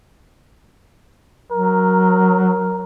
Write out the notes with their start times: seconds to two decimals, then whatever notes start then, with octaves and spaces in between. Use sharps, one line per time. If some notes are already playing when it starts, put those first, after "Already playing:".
1.52 F#3 A#4